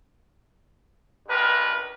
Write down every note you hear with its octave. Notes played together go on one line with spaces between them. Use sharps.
C#2 G2 A#4 B4